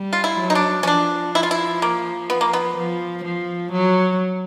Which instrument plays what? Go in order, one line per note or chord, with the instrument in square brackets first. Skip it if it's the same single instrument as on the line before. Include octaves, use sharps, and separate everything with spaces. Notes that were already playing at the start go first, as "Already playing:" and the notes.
Already playing: [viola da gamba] G3
[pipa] F4
E4
[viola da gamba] F#3
[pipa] D#4
D4
C#4
[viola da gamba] F3 [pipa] D4
[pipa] E4
F4
E4
A#3
B3
A#3
B3
[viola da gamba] F3
F3
F#3